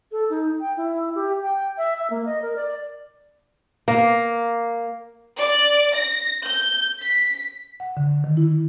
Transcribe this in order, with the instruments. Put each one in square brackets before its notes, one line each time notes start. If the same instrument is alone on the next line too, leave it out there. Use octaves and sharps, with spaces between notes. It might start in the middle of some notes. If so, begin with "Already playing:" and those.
[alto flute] A4
D#4
G5
E4
G4
G5
E5
E5
A#3
D#5
A#4
D5
[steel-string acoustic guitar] A#3
[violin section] D5
A#6
G6
B6
[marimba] F#5
D3
D#3
E4